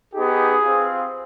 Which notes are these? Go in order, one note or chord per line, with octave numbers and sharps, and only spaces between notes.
B3 D#4 G4 G#4
C4 F4